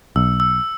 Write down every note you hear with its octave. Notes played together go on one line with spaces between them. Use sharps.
B1 E6
E6